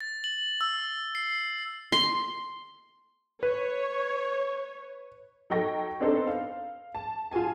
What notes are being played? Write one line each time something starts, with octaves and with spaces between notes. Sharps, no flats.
A6
F#7
E6
C7
C6
B4 C#5
F#3 D#4 A4 G5 C#6 A#6
B3 C4 D4 D#4 A4 C5
F5
A5
F4 F#4 G#4 G#5 A5